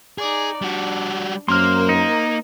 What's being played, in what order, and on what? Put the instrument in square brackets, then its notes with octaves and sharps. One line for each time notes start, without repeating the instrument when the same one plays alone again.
[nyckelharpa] D#4 D5 [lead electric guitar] G#4
[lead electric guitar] G3 F#4 [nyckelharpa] D4
[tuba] F#2 [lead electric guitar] A#3 [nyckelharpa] A#4 C5 [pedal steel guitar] C6 F6
[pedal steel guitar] D#4